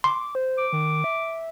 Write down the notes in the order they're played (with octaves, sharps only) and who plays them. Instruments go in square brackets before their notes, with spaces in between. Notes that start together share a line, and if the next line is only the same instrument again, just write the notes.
[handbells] C6 [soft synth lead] D6
[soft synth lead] C5
[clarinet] D6
[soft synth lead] D#3
E5